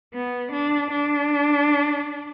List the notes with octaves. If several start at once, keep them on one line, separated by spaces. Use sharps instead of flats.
B3
D4
D4